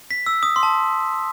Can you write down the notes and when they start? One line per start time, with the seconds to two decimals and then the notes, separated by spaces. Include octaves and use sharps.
0.11 B6
0.26 E6
0.43 D#6
0.56 C6
0.63 A5